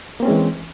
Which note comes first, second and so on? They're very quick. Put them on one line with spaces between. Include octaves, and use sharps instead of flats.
A#3 C4 C#4 G#3 E3